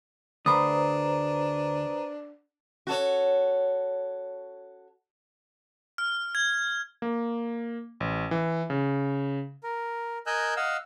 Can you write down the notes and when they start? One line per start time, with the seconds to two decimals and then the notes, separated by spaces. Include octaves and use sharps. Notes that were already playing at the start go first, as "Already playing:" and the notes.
0.46 D2 D4 B4 C5 A#5 B5 D#6
2.87 F#4 A4 C#5
5.98 F6
6.35 G#6
7.02 A#3
8.00 A1
8.31 E3
8.70 C#3
9.63 A#4
10.27 A#4 D#5 G#5 E6 F#6 G6
10.56 D#5 F5 F#5 E6